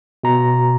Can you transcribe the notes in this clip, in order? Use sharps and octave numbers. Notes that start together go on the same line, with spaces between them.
B2 A#5